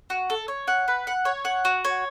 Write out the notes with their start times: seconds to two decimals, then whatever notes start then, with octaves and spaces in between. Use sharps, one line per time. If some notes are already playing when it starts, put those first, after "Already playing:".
0.10 F#4
0.30 A4
0.48 C#5
0.68 F#5
0.88 B4
1.07 F#5
1.25 C#5
1.45 F#5
1.65 F#4
1.84 C#5